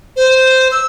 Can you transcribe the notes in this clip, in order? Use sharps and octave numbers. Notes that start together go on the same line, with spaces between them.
C5
E6